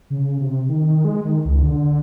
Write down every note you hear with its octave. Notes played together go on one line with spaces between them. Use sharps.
C#3
C3
D#3
G#3
D#3
C#2
D3